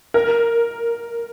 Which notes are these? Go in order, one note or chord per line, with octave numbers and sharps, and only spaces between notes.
A#4